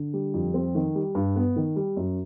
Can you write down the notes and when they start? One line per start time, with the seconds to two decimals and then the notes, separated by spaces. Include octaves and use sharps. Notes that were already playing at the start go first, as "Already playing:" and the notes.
Already playing: D3
0.13 G3
0.34 F2
0.54 C4
0.75 D#3
0.95 G3
1.15 G2
1.36 B3
1.56 D#3
1.76 G3
1.97 F#2